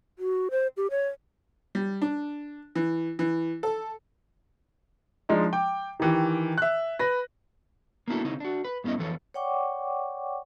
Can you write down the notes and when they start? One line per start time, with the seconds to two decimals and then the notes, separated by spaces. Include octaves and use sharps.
0.19 F#4
0.51 C5
0.77 G4
0.91 C#5
1.75 G3
2.02 D4
2.75 E3
3.19 E3
3.63 A4
5.29 F3 G#3 D4 D#4
5.53 G5 D6
6.00 D#3 E3 G4
6.58 E5 F#6
6.99 B4 A#6
8.08 A#3 B3 D4 E4 F#4 A4
8.25 C#3 C4 D#4 E4
8.40 D4 F#4
8.65 B4
8.84 G2 B3 C#4 E4 D#5
8.98 F2 E3 A4 C#5
9.34 C#5 D5 F#5 G5 C#6 D6